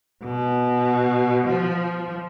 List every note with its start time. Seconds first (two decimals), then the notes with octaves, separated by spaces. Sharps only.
0.24 B2
1.47 F3